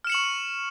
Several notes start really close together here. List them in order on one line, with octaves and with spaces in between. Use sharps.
F6 E7 C#7 F#7 C#6